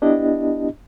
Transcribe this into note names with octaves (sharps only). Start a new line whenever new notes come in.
B3 D4 E4 G4 D#5